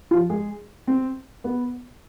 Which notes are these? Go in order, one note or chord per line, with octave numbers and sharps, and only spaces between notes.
F3 F4
G#3 G#4
C4
B3